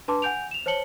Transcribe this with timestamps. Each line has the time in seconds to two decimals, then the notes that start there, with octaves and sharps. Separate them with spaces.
0.08 D4 B4 A5 C6 D6
0.22 F#5 G#5 G6 D7 F7
0.51 E7 F7
0.66 C5 C#5 A5 C#7 F#7 G7